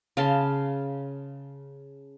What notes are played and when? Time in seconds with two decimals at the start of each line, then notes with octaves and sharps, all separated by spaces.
0.17 C#3 F5 A5 C6